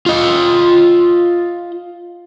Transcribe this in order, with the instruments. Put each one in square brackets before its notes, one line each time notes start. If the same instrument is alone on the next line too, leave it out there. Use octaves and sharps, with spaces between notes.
[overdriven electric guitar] F4 D#5